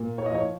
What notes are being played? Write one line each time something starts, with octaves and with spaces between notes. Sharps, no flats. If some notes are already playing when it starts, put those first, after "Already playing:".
Already playing: A#2
C#5
D#5
F3 C#5